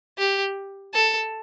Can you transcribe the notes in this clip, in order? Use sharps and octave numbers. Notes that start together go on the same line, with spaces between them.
G4
A4